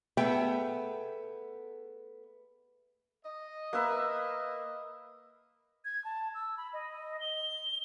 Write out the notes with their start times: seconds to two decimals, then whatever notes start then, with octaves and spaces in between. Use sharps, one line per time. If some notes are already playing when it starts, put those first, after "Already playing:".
0.17 A3 B3 G#4 E5 G5
3.25 D#5
3.73 A#3 B4 E5
5.85 G#6
6.04 A5
6.34 E6
6.57 B5
6.73 D#5
7.20 G7